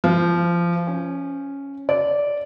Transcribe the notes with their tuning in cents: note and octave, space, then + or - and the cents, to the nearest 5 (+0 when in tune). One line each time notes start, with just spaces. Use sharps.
F3 -20
C#4 +0
D5 -10